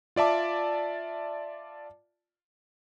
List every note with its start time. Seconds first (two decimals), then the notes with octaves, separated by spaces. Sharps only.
0.16 F4 D5 E5 A5 D6